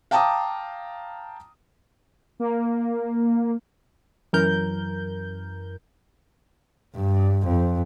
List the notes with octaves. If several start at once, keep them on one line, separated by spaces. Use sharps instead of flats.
F5 G5 A5 A#5 D6 D#6
A#3
F#2 E3 A#4 G6
G2
F2